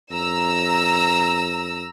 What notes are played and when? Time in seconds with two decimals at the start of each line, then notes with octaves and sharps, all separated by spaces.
0.11 F2 A#5 E6